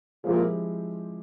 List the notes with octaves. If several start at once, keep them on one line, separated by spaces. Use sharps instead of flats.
A#2 F3 G#3 C4 E4 G4